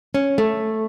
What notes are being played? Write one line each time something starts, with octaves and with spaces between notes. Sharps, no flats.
C#4
A3